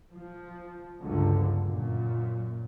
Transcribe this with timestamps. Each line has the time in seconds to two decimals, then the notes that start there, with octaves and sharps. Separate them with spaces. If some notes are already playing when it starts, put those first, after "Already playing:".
0.12 F3
1.01 G1 C#2 G2 D3 F3 F#3
1.64 F#2 A#2